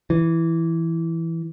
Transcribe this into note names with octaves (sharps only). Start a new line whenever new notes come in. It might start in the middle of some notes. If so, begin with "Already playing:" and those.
E3